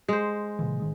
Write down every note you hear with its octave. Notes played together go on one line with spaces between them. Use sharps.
G#3 C5
A#2 C#3 E3
A1 D#3 G#3